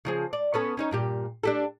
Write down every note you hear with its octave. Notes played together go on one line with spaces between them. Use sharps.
C#3 F3 G#4
D5
B3 C#4 A4
C#4 D#4 C#5
G2 A#2 G4
D4 G4 A4